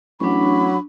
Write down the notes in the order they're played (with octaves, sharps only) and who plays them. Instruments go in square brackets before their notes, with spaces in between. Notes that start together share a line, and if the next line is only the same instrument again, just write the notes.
[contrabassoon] A1 [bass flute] F#3 [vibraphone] D4 C#6 [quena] B5